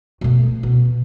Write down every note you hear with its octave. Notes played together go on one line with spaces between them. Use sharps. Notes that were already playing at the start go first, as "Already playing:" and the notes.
B2 A3
B2